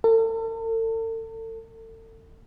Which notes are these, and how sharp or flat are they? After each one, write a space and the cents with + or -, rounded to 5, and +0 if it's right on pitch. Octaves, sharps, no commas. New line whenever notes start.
A4 +40